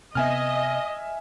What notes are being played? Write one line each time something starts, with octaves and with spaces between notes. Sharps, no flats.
C3 B3 D#5 E5 G#5 F6